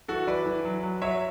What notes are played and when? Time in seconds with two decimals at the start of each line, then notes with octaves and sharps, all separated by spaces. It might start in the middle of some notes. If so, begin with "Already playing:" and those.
0.08 E3 F#4 A4
0.27 E3 B4 D5
0.46 E3
0.65 F#3
0.83 F#3
1.02 F#3 C#5 E5